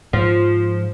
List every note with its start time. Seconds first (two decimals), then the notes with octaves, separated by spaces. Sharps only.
0.13 G#2 F3